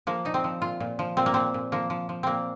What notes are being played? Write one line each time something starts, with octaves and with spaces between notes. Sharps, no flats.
F3 A#3
A#2 D#4
C4
F3
A#2 F4
A#2
F3
A#2 C4
A#3
A#2 C4
A#2
F3 A#3
F3
F3
A#2 A#3 C4